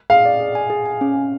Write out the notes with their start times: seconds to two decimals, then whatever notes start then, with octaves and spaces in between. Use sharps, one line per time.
0.10 G#4 F5
0.25 D5
0.40 G#4
0.55 G#5
0.70 G#4
0.86 G#5
1.01 C#4
1.16 C#4